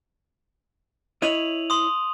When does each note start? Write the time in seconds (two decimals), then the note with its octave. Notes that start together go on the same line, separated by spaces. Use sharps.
1.22 E4 C#5 D#5 D#7 F7 F#7
1.70 C6 D#6